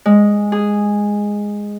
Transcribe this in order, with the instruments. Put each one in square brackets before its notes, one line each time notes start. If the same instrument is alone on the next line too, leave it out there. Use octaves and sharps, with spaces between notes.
[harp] G#3
G#4